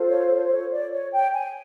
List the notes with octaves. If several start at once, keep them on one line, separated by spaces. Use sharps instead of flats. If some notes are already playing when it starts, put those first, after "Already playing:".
Already playing: F4 A4 C5
C#5
C#5
D5
C#5
G5
G#5